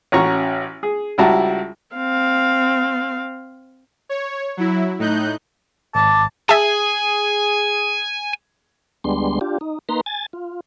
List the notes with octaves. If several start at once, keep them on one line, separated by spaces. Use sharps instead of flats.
A1 C#4 F#4 A#5 C#6
G#4
C#2 G3 E4 F#4 A5 A#5
C4 F5
C#5
F#3 E4
A2 D#4 F#6 G6
G#1 A5 D6
G#4 E5 G#5 A5
D2 G3 G#3 B3 D4 C6
D4 F4 G4
D#4
A#3 D#4 B4 A#5 C6
G#5 A6
F4